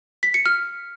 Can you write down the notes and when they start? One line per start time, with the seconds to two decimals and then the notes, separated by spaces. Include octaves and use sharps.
0.23 B6
0.34 C#7
0.46 F6